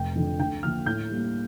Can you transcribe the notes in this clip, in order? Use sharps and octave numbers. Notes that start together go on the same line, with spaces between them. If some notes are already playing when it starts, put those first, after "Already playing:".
Already playing: F1 G5
F2 D3
D2 G5
D3 F3 A#3 F6
A2 G6
G3 A#3